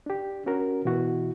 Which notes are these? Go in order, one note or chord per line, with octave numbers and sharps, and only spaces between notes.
D4 G4
C#4 F#4 A#4
B2 E3 E4 F#4